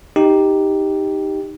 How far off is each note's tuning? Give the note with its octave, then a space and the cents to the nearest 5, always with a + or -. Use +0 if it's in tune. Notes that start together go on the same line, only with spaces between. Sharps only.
D#4 +0 G4 +0